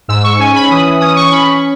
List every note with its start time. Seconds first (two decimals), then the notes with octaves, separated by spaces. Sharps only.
0.08 G#2 E6
0.24 C#6
0.39 C#4 G#5
0.56 B5
0.71 E3 D#6
1.01 C#4 D#6
1.16 C#6
1.31 C#4 B5